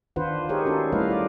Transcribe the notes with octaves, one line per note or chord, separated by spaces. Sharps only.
D#3 D4 F4 B4 C5 F#5
D#4 G4 G#4 A#4 C5 C#5
C#4 D4 F4 F#4 A4
G3 A3 E4 B4 D#5 F5
F4 D5